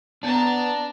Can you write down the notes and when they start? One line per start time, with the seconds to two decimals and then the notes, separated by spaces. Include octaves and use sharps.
0.23 B3 D4 A5 A#5